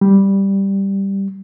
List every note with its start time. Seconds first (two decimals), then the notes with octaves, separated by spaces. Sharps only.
0.01 G3